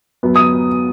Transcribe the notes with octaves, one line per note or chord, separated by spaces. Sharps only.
F#2 F#3 B3
D#6